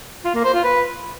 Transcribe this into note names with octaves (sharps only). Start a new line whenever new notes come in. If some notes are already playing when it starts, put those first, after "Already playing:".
F4
A#3
C5
F4
B4